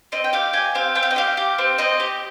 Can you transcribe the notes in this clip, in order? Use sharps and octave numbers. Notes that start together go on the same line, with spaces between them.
C4 D#5
G5
G4 F5
G4 G#5
C4 F5
C4 G5
F5
D#5
G4 F5
G4
C4
C4 D#5
G4